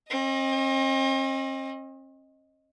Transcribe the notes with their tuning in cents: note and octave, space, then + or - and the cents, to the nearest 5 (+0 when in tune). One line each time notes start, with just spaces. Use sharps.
C4 +45 D#5 +0